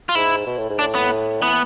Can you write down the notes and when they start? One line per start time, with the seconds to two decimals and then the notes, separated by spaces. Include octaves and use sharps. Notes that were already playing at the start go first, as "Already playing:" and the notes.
0.09 F4
0.15 G#2 E4
0.47 B2
0.58 A2
0.69 G#2
0.79 A2 D4
0.95 B3
1.42 E3 B3